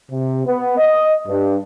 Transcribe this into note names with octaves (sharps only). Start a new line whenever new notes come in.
C3
B3
D#5
G2